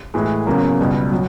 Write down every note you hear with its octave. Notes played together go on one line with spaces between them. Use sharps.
A2 E3 G#3
E2 C#3 F#3 A#3
C#2 B2 G3
F#3